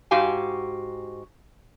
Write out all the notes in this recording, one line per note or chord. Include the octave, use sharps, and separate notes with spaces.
G#2 F#4 G4 F5 G#5